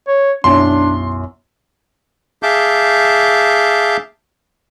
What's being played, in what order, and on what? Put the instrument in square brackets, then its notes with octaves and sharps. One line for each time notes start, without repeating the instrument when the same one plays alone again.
[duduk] C#5
[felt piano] B1 F#2 E4 [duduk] D4 [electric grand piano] C6
[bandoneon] G#4 E5 F5 A5 D6 G6